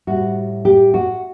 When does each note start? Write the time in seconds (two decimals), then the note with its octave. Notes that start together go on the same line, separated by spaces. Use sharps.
0.07 A2 G3 F#4
0.65 G4
0.94 F#4